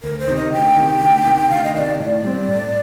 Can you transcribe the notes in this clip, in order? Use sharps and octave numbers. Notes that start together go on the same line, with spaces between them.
D2 A#4
C5
C3 D#3
D#5
D2 G5
C3 D#3
D2
C3 D#3
D2 F5
D#5
C3 D#3 D5
A2 D5
G3 C4
A2